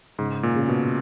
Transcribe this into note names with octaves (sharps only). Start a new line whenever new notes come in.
G#2 C#3
A#2
C#3
B2